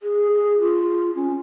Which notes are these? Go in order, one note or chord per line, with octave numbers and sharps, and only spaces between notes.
G#4
G#4
F4
C#4